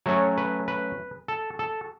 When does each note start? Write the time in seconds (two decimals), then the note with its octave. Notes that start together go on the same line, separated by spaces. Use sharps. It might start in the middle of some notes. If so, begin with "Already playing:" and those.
0.06 F#3 A3 C#4 C#5
0.38 B4
0.68 B4
1.28 A4
1.59 A4